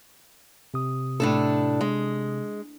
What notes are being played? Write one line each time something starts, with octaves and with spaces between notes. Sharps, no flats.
C3 D#6
A2 D4 A4
G#3